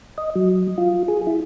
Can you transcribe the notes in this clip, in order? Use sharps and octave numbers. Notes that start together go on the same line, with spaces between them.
D#5
F#3
F4
G#4
E4